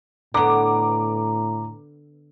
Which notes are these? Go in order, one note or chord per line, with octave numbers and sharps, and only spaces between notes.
A2 D3 B3 A#5 D6